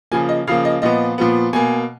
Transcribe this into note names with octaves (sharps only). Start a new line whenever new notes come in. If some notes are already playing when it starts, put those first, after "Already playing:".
C#3 F3 A#3 G#5
D#5
C#3 F3 A#3 F5
D#5
A#2 F3 B3 D#5
A#2 F3 B3
B2 A#3 G#5